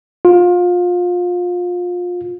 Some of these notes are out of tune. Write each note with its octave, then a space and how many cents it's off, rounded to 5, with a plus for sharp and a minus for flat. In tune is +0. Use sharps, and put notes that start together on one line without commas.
F4 +25